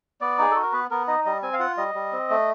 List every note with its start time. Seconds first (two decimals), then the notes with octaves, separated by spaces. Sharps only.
0.21 B3 D5
0.39 D#4 G#4
0.51 F#4 A4
0.62 A#4
0.73 B3 B4
0.91 B3 A#4
1.08 D#4 D#5
1.25 G3 D#5
1.43 C4 G#5
1.53 F5
1.60 F4 F#5
1.77 G3 D#5
1.95 G3
2.12 C4
2.30 A3